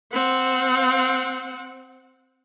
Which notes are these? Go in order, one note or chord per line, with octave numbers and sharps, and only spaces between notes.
C4 F#5